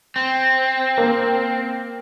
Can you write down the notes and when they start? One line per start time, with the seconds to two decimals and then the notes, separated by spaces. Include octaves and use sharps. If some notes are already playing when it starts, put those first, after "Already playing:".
0.16 C4
0.98 A#3